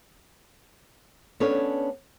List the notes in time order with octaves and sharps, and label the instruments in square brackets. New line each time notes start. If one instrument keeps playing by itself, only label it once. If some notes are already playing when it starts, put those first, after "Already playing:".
[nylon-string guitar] B3 C#4 D4 A4 C#5